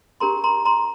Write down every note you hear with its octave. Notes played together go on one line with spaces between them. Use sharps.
D4 G4 A#4 A#5 C6
A#5 C6
A#5 C6